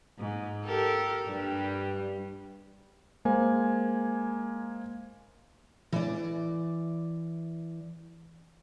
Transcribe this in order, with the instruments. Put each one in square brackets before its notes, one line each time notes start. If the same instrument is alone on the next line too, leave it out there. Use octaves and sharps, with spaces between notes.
[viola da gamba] G#2
G4 A4 A#4
G2 G3
[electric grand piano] G#3 A#3 C5 G#5
[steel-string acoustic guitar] E3 D5